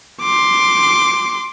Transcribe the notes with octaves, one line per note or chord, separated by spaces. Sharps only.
C6 D6